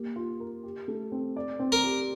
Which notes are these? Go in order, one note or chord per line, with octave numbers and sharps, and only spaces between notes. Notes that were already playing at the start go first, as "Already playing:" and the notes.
Already playing: A#3 G4
F4
A#4
G4
A3
C4
D5
C4
A#4
G4